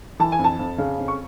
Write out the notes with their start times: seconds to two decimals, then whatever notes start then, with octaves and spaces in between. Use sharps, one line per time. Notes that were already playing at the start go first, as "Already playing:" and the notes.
0.19 E3 A5
0.32 G#5
0.39 F2
0.44 A5
0.59 F2
0.78 C#3
0.99 F2
1.08 C#6